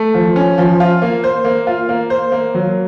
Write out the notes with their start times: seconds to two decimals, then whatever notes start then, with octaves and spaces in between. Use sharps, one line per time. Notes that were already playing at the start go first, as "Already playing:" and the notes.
Already playing: A3
0.14 F3
0.36 C#4
0.58 F3
0.80 F4
1.02 A#3
1.24 C5
1.45 A#3
1.67 F4
1.89 A#3
2.10 C5
2.32 A#3
2.54 F#3